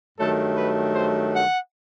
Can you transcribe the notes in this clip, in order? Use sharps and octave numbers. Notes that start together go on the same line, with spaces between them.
G2 D#3 F#3 A3 A4
B4
C5
F#5